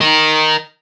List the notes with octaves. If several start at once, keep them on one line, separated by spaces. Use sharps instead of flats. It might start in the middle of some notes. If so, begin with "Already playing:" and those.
A#4 D#5